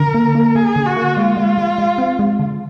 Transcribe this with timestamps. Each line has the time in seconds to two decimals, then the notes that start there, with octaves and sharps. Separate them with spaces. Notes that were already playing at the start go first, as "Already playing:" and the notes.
Already playing: D3 A#4
0.14 A#3
0.35 A#3
0.55 A#3 G#4
0.76 D3
0.86 F#4
0.97 A#3
1.17 G#3 F4
1.37 G#3
1.58 G#3
1.78 G#3
1.98 C4
2.19 G#3
2.39 D3